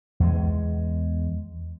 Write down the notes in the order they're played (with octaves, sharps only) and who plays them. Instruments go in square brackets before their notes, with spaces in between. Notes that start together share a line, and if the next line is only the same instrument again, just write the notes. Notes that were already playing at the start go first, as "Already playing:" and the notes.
[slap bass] E2 G#3